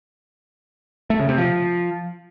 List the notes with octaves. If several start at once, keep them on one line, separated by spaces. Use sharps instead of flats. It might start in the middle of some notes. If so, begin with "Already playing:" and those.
A3
C#3
C3
F3